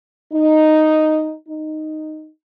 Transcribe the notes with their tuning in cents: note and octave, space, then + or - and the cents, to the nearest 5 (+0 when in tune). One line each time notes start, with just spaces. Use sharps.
D#4 -5
D#4 -5